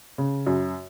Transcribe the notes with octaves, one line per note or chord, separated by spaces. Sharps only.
C#3
F#2